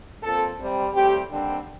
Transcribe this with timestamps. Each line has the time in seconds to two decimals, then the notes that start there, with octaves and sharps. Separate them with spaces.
0.22 A#2 F3 C4 A4
0.59 C3 G3 C4
0.93 A2 G3 C4 G4
1.30 D#2 D3 G3 C4